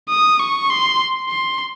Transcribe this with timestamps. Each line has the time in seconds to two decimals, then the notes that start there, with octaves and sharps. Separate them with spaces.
0.09 D#6
0.39 C#6
0.69 C6
1.29 C6